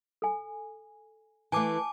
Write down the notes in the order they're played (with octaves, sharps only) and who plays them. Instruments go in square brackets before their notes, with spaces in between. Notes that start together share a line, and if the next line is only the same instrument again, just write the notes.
[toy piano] A4 G#5
[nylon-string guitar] E3 A3 [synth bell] G#5 A5 D6